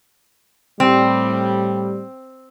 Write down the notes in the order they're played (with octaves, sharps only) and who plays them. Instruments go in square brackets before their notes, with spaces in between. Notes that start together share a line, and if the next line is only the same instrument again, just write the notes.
[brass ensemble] A2 G3 [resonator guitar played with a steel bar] C4